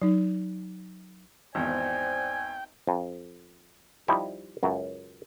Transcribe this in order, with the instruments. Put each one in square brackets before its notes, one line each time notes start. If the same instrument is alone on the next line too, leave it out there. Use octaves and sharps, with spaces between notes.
[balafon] F#3 D#4
[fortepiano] G#1 E2 [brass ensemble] C5 D5 [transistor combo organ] G5 [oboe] G#5
[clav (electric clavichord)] F2
F3 G3 D#4 E4
C#2 F#2 F#3